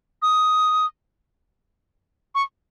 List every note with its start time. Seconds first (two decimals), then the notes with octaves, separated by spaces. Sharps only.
0.22 D#6
2.35 C#6